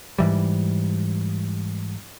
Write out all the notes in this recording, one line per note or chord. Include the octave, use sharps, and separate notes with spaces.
G#2 E3 G3